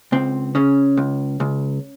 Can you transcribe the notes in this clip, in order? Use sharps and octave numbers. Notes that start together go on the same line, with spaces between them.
C#2 C4
C#3 C#4
C#2
C#2